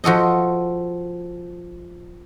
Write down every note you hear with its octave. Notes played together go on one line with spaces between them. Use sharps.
F3 F#4 A4 D#5